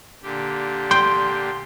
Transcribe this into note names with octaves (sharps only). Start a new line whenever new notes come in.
A#2 D3 G4
G5 C6